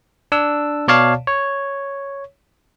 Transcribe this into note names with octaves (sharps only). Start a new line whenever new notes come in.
D4 E6
B2 C#5 D5 F5 A5
C#5